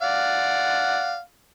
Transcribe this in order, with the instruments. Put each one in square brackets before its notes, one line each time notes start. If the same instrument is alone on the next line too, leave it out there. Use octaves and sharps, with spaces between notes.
[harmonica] D5 F5 F#5